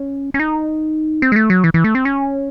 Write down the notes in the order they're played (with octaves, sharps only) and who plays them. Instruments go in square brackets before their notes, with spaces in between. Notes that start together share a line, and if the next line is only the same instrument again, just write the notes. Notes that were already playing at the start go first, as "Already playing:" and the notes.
Already playing: [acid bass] C#4
C#4
D#4
C4
G#3
A3
F#3
E3
E3
A3
C4
C#4